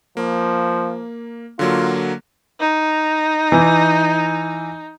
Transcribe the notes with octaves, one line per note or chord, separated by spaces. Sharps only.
F3 A#3
D3 F#3 A#3 F4
D#4
E3